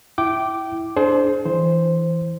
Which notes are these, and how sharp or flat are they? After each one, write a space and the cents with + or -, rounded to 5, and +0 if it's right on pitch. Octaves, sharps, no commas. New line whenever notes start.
E4 +0 G5 -20 D6 +0
D4 +0 G#4 +40 C5 +0
E3 +0 C5 +0